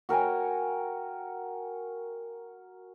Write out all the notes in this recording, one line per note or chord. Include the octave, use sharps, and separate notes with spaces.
F#4 A#4 G5 G#5